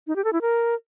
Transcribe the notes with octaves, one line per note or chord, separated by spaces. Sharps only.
D#4
G4
A4
E4
A#4